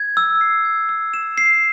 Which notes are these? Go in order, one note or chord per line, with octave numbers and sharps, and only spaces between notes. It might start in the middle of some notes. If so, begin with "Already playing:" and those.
Already playing: G#6
E6
C7
G#6
E6
E7
C7